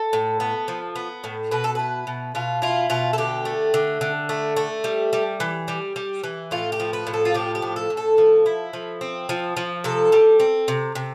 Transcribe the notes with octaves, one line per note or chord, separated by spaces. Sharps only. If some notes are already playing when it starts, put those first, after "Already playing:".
Already playing: A4
A2
B3
F3
B3
A2
B2 B4
A4
E4 B4
B2
B2 F4
E4 F4
B2 F4
A4
D3 G4
A3
D3
D3
A3
A3
G3
G3
E3
G3
G3
E3
A2 F4
G4
F3
B4
A2
A4
F4
F3 G4
G4
A2
A4
A2
A4
F3
E4
F3
C4
F3
F3
C3 A4
G3
C4
C3
C3